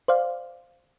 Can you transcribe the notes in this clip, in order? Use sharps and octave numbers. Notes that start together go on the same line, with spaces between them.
C5 D5 F5